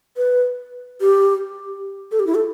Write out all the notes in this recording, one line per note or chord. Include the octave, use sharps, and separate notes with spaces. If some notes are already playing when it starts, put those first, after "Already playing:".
B4
G4
A4
G4
E4
A4